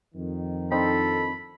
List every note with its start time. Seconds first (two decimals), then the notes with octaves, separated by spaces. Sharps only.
0.15 F2 D#3
0.72 C4 D4 D#4 A4 B5